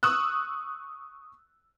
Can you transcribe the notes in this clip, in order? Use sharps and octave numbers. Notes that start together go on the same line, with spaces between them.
C#6 D#6 E6 F#6